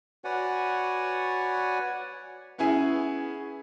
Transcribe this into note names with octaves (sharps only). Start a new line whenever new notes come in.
F#4 B4 C#5 D5 F#5 G#5
B3 C#4 E4 G#4 G#5